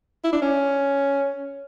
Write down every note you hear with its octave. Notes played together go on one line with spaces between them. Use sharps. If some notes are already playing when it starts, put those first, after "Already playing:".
E4
D4
C#4